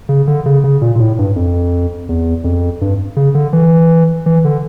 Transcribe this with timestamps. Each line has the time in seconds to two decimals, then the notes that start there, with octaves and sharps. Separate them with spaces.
0.09 C#3
0.27 D3
0.46 C#3
0.64 C#3
0.81 A#2
0.95 A#2
1.00 A2
1.19 G2
1.36 F2
2.09 E2
2.44 F2
2.81 G2
3.16 C#3
3.35 D3
3.53 E3
4.26 E3
4.44 D3